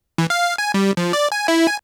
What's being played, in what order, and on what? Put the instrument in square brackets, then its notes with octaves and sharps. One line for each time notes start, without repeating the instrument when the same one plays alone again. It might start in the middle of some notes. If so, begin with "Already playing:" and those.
[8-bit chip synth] E3
F5
G#5
G3
F3
D5
G#5
E4
G#5